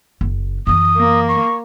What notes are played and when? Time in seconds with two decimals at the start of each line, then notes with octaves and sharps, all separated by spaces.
0.21 F#1
0.67 F#2 E3 D#6
0.98 A#3
1.29 C#6